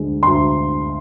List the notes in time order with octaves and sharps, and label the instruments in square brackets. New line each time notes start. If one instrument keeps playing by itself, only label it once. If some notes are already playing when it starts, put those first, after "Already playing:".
Already playing: [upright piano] D2 D3 G#3
D2 D3 G#3 C6